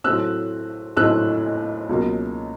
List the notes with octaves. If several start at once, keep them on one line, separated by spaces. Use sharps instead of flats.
A2 F#3 A3 C4 E6 F#6
A2 F#3 A3 C4 E6 F#6
C#2 B2 F#3 A#3